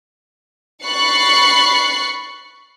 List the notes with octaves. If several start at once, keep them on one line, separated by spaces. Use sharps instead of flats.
B5 C#6 F#6 A6 C7 C#7